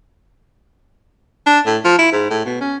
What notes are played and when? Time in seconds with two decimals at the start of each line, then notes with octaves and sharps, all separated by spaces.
1.47 D4
1.66 A2
1.85 F3
1.99 E4
2.12 G#2
2.30 A2
2.46 B2
2.61 C#4